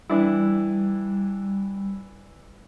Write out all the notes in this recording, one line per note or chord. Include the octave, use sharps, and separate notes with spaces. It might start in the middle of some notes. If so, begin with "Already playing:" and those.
E3 G3 D4 E4